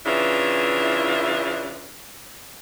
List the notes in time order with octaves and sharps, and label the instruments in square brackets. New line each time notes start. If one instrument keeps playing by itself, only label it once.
[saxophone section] C#3 E3 D4 E4 F4